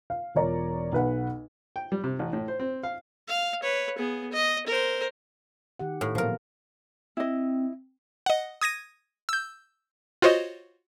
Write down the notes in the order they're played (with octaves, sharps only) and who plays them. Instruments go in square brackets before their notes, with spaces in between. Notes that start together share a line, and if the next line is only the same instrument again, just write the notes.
[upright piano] F5
E1 F4 A#4 C#5 D5 A#5
B1 B4 F#5
[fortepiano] G5
G3
C3
A1
A2
C5
C4
F5
[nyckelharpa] F5
B4 C#5
B3 G#4
D#5
A#4 C5
[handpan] D#3 G4 F#5
[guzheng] A2
[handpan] A#2 F#3 B3 [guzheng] F3 A#4
[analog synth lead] C4 [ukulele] E4 D#5
[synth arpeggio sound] D#5 F#5
D#6 G#6 A#6 D#7
E6 G6
F4 F#4 C5 C#5 D#5